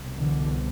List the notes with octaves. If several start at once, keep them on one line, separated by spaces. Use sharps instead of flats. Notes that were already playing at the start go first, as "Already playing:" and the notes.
Already playing: C2 B2
D3 E3